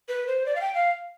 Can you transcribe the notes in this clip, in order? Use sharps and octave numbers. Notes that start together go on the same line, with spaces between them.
B4
C5
D5
F5
G5
F5